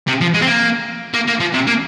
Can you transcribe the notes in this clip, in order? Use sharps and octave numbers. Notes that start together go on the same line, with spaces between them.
C3
F3
G#3
C4
A#3
A#3
A#3
F3
C3
A#3